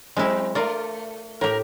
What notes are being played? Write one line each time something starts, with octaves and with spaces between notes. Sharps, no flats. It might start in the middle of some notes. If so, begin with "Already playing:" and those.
F#3 G#3 C4 E4
A3 F4 A#4 D5
A2 G4 A#4